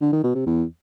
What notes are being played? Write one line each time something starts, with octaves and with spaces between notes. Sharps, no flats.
D3
D#3
B2
C3
E2